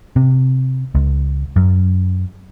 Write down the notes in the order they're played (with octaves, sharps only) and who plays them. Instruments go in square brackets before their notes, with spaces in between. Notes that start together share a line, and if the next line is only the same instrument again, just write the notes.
[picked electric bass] C3
C#2
F#2